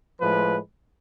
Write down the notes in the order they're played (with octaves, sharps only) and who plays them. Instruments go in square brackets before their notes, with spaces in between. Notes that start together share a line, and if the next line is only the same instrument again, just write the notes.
[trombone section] A2 F3 G#3 B4